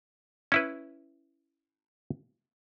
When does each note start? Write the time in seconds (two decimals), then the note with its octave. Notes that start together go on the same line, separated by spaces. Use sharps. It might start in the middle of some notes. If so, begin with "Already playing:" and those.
0.52 C#4 E4 B4